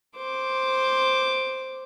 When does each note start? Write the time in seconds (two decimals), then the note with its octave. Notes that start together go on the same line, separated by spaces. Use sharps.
0.16 C5 D6